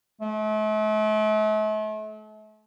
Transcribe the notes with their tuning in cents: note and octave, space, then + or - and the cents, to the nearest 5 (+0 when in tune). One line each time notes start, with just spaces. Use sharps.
A3 -40